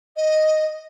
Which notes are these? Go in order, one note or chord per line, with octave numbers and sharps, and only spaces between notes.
D#5